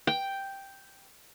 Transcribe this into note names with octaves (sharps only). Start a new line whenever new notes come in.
G5